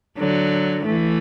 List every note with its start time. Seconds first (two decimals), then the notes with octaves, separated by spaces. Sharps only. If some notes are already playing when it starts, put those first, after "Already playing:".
0.18 D3 F#3
0.85 E3 A3